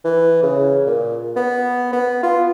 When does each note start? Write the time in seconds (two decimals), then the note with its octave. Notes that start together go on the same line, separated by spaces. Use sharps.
0.05 E3
0.43 C#3
0.86 A#2
1.36 B3
1.93 B3
2.23 F4